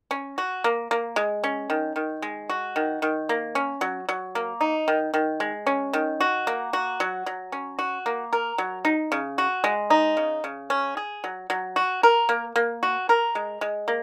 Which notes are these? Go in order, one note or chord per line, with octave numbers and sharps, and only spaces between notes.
C#4
F#4
A#3
A#3
G#3
C#4
D#3
D#3
G#3
F#4
D#3
D#3
A#3
C#4
F#3
F#3
A#3
D#4
D#3
D#3
G#3
C#4
D#3
F#4
A#3
F#4
F#3
F#3
C#4
F#4
A#3
A#4
F#3
D#4
C#3
F#4
G#3
D#4
C#3
C#3
C#4
G#4
F#3
F#3
F#4
A#4
A#3
A#3
F#4
A#4
G#3
G#3
A#3